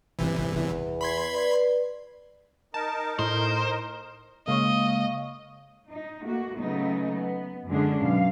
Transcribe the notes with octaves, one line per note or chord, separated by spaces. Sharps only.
G1 C3 E3
E2
B5 C6 G#6
B4 D5
D#4 A#4 A5
A2 C5
C#3 G#3 A#3 C#5 D#5 F5
D#4
A3 A#3 F#4
C#3 F#3 A3 B3 D#4
B3
F#2 D3 G#3 C#4 D4 G#4
F#2 B2 F5